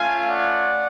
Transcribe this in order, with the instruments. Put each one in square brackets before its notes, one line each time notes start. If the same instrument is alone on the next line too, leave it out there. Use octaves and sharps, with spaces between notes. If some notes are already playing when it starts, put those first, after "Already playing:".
Already playing: [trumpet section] A3 C#4 F4 F5 G#5
D5 F#5